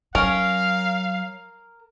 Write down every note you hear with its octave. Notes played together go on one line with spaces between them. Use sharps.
F#3 C#4 A#4 F5